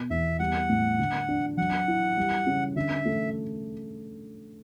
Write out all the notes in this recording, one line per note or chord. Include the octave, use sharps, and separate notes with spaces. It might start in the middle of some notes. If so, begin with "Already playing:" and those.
Already playing: B2
E2 E5
G3 F#5
A2
D3
D4
F#3 F#5
E4
G3
C#3
D3 E5
A3